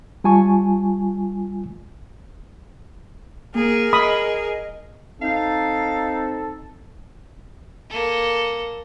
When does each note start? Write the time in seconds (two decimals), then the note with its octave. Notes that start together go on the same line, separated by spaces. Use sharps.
0.24 G3 F4 G#5 A5 C#6
3.55 A#3 G#4 A#4
3.93 D#5 B5 D#6
5.22 C4 D#4 A4 F5
7.90 A#3 A4